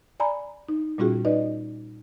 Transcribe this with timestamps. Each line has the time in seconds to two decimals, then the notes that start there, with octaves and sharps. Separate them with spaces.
0.20 D5 G#5 A#5 B5
0.69 D#4
0.98 A#2 G3 C#4 F4 F#4 G#4
1.25 D#4 B4 D5 D#5